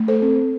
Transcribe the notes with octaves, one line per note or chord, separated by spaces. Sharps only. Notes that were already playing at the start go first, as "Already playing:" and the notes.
Already playing: A3
A4 C5
C4